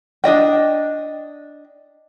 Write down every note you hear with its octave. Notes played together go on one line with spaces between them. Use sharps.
D4 G#4 D#5 G5